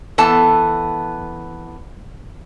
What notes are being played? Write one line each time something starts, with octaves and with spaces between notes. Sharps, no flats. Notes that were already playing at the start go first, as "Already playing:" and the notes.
E3 B3 A4 A5